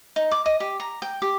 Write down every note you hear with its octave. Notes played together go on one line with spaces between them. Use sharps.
D#4
D6
D#5
G4
A#5
G5
G4